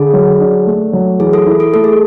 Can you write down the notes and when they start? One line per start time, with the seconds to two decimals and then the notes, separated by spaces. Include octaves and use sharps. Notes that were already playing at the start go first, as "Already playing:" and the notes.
Already playing: D3 G#4
0.13 F#3
0.41 D4
0.66 A3
0.93 F#3
1.20 E3 G#4
1.33 A4
1.46 E4
1.60 A4
1.74 A3 A4
1.84 G#4